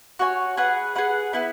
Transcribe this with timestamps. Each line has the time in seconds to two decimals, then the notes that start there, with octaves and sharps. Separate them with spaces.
0.19 F#4 C#5 G#5
0.57 G#4 B4 F#5
0.95 G#4 B4 F#5
1.33 B3 E4 B4